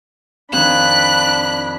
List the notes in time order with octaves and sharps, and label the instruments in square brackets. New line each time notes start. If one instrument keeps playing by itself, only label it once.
[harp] F2 D#3 [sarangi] D4 [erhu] B5 [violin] F#6